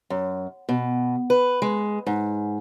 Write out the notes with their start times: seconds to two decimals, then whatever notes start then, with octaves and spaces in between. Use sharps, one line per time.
0.10 F#2
0.69 B2
1.30 B4
1.62 G#3
2.07 G#2